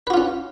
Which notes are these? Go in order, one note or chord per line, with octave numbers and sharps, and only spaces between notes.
C#4 F4 F#4 B4